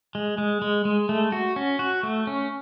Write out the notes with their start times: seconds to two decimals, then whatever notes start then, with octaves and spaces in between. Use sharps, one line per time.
0.15 G#3
0.38 G#3
0.62 G#3
0.85 G#3
1.09 A3
1.32 F#4
1.56 C#4
1.79 F#4
2.03 A3
2.27 C#4